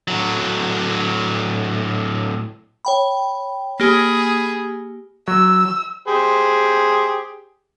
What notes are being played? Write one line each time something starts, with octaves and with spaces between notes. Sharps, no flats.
A2 F#3
C#5 G5 B5
A#3 G4 G#4 B5
F#3 E6
G4 G#4 C5